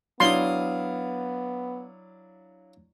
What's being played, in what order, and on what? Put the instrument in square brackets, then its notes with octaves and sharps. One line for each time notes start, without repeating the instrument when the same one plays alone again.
[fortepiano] F#3 D4 E4 [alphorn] B3 [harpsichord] F5 D#6 [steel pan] C6